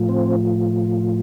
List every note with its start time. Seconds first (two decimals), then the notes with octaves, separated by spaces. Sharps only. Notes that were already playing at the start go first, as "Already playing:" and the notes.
Already playing: A2 F3
0.09 C4